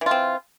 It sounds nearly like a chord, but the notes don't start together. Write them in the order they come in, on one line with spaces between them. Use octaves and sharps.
E3 F4 C4